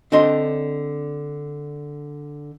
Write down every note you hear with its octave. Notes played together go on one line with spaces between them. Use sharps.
D3 C4 D4 C5 D#5 C6